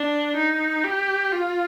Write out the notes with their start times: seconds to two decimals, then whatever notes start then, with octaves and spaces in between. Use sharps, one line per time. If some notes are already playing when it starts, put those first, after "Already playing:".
Already playing: D4
0.36 D#4
0.84 G4
1.32 F4